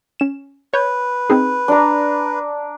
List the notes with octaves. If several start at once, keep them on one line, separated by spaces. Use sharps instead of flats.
C#4 E7
B4 C#5 G6
C4 D#4 G#4
D4 A#5